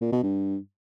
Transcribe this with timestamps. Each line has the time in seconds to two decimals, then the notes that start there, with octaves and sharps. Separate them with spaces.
0.01 A#2
0.12 B2
0.23 G2